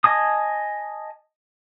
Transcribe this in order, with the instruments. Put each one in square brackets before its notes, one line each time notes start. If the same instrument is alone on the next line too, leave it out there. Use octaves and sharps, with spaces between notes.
[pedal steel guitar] D#5 G#5 A5 D#6